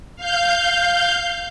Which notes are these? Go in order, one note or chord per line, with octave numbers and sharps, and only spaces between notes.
F5 G6